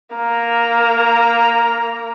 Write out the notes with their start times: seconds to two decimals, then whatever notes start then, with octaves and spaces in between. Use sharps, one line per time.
0.16 A#3 A#5